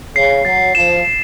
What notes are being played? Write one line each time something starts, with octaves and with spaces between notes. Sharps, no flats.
C#3 C7
F#3 A6
F3 E7
E7